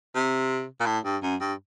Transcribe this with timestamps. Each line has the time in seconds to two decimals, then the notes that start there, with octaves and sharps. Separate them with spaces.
0.15 C3
0.80 A#2
0.86 A2
1.04 G2
1.23 F#2
1.41 G2